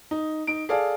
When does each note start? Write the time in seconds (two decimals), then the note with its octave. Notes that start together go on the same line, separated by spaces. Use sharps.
0.11 D#4
0.47 D#4 D7
0.69 G#4 A4 D5 F5